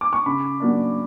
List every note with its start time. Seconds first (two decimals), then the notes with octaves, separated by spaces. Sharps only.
0.01 D6
0.13 C#6
0.26 C#3 B5
0.60 F#3 A#3 D4